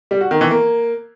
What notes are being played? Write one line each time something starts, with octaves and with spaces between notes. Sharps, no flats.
G3
F#4
D#3
E3
A#3